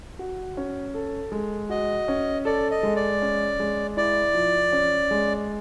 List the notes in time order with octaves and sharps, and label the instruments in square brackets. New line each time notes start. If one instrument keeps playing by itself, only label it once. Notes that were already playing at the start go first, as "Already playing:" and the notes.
[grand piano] F#4
C#4
A4
G#3
[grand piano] F#4 [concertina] D#5
[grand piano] C#4
[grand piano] A4 [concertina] D5
[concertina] D#5
[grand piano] G#3
[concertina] D5
[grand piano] C#4
G#3
[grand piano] E4 [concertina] D5
[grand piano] F3
C#4
G#3